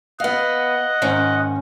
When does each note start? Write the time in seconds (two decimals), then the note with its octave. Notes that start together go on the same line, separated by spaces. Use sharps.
0.20 B3 D#5 F5 F#5
1.02 G#2 D#3 C#4